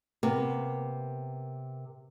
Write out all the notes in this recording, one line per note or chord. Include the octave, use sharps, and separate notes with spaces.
C3 A#3 B3